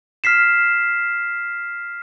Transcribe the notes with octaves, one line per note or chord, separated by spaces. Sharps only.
F6 B6 C7 E7